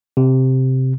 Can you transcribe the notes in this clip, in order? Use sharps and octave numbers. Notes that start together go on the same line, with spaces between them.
C3